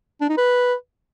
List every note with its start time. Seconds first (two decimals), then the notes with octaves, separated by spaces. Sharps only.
0.21 D4
0.29 D#4
0.37 B4